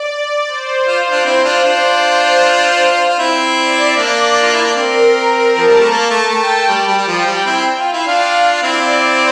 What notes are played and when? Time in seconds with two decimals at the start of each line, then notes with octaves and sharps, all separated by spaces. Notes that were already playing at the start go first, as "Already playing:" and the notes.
Already playing: D5
0.48 C5
0.87 F4
1.10 D4 F4
1.25 C4 E4 C5
1.44 D4 F4
1.64 D4 F4
2.02 C5
3.08 F4
3.19 C4 E4
3.58 D5
3.97 A#3 D4 D5
4.42 F4
4.53 E4
4.64 D4
4.75 C4 A#4
5.13 A#4
5.52 A5
5.57 F3
5.69 G3
5.79 A3
5.91 A#3 A5
6.10 A3
6.29 A3 G5
6.69 G3
6.88 G3
6.98 G3
7.07 F3 G5
7.27 G3
7.46 C4 E4
7.79 F4
7.85 F5
7.93 E4
8.06 D4 F4
8.52 F4
8.62 C4 E4 D5
9.01 C5